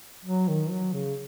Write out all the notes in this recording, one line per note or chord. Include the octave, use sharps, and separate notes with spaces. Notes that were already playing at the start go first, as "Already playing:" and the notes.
F#3
D#3
F#3
C#3